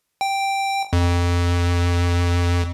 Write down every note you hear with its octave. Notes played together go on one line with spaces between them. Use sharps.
G5
F2